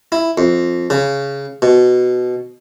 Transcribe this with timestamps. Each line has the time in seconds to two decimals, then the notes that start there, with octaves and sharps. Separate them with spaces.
0.12 E4
0.38 F2
0.90 C#3
1.62 B2